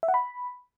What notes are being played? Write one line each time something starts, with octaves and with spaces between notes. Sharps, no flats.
E5
F#5
B5